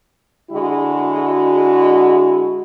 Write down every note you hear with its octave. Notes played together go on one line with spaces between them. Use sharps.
D3 G#3 E4 F#4